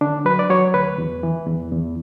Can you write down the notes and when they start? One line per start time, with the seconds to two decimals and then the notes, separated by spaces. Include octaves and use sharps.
0.01 D3 D4
0.25 F#3 B4
0.39 D5
0.50 F#3 C#5
0.74 D2 B4
0.98 E2
1.23 E3
1.47 E2
1.72 E2